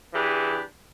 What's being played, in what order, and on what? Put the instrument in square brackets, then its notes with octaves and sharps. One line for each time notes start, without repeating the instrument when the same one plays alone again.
[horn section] E3 D4 G4 G#4 B4